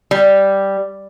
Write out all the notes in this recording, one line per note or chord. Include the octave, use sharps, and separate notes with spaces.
G3